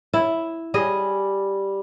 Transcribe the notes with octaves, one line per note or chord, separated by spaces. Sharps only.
E4
G3 G#4 D#5